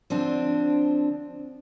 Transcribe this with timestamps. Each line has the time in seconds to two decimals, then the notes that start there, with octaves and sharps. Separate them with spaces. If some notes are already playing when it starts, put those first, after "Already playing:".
0.10 D3 F3 C4 D4